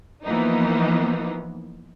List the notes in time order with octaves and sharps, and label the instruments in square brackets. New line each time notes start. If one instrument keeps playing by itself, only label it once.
[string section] E3 F3 A#3 B3 D#4